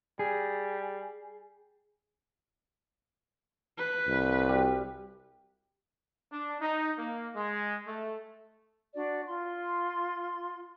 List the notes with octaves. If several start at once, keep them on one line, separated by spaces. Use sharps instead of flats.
G3 G#4
B4
C2
G3
D4
D#4
A#3
G#3
A3
D4 F#4 D5
F4 C6